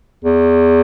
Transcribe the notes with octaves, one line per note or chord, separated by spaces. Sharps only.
E2